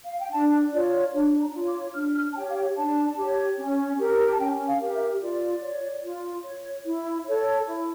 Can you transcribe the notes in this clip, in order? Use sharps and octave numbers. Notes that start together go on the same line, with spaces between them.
F5
G5
D4 A5
F4 C#5 D5
D4 C#5
A#5
F4 C#5
D6
D4 F6
F6
A5
G4 C#5 G5
F5
G5
D4 A5
G4 C#5
C#4
G4 A#4
A5
C#4 G5
F5
G4 A#4
E5
F4 D5
C#5
F4
C#5
E4
A4 C#5
E4 C#5